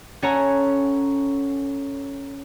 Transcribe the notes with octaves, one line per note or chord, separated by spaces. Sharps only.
C#4 A4 C#5 F#5 G#5 A#5